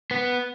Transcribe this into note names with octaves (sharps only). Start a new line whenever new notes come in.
B3